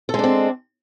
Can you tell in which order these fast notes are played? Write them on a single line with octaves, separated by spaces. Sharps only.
A4 G#3 D4 C4